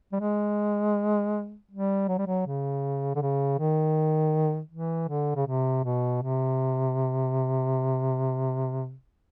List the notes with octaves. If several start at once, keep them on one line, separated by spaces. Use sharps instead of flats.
G3
G#3
G3
F#3
G3
F#3
C#3
D3
C#3
D#3
E3
D3
C#3
C3
B2
C3